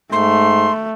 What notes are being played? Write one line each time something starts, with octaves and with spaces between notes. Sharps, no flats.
G#2 A3 C6